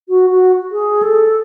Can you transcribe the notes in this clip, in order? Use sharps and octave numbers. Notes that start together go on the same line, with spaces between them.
F#4
F#4
G#4
A4